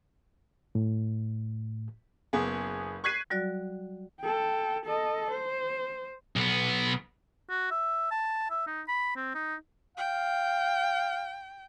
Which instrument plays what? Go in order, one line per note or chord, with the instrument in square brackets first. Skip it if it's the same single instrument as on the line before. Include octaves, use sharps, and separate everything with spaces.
[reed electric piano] A2
[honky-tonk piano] F#1 B3 G#4
C#6 F#6 G#6 B6 C7 D#7
[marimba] F#3 G3 F#4 D5 F#6
[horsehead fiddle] A4 G5
A4 D#5
C5
[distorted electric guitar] B1 B3
[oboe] F#4
E5
A5
E5
D#4
B5
C4
D#4
[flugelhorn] F5 [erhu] G5